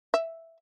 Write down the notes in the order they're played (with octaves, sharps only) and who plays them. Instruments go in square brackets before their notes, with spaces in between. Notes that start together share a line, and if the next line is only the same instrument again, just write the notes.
[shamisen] E5